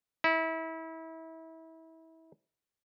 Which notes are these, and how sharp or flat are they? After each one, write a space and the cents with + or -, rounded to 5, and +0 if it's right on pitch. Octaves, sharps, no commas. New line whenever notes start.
E4 -30